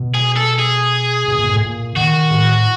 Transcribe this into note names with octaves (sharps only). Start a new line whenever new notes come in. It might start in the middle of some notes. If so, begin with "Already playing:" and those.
Already playing: B2
G#4
A4
G#4
B2
A#2
A2
A#2
D#3 F#4
A2